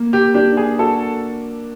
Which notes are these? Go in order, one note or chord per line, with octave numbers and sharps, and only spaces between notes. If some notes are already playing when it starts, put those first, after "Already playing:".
Already playing: A#3
G4
D4 G4
G#4
F#4 A4